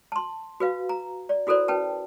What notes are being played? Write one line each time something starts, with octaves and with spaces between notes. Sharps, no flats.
A5 C6
F#4 B4 F5
A#5
D5
E4 F#4 A4 A#4 C5 D5
C#4 B4 G5 A5